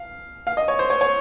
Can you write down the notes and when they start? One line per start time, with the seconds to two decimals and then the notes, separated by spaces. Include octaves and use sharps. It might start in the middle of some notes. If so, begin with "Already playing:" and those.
Already playing: F5
0.47 F5
0.57 D#5
0.68 C#5
0.79 C5
0.90 C#5
1.01 C#5